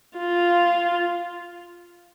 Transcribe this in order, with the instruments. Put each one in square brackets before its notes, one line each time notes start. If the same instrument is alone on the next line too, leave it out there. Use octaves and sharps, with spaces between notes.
[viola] F4